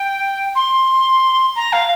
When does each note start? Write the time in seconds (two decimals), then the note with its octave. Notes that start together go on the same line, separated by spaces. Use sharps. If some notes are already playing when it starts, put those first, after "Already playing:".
Already playing: G5
0.55 C6
1.56 A#5
1.73 F5